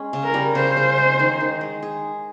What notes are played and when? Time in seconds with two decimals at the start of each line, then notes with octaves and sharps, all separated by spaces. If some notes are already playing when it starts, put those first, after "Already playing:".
Already playing: G#3 C#4
0.13 C#3
0.24 A#4
0.34 G3
0.55 C#3 C5
0.77 C#3
0.98 G#3
1.20 D#3
1.40 D#3
1.61 G#3
1.82 G#4